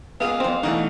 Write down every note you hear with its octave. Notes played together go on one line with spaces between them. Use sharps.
C#2 A#2 B3 G#4 F5
F2 C4
B2 E3 A3 D#4 F#4 D5